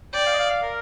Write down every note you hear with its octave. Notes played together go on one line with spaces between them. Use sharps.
D5 G5
F5
D#5
F5
F5
A#4